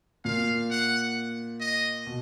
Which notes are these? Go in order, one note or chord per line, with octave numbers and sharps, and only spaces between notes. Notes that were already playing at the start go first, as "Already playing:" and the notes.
A#2 F5
F#5
D#5
B2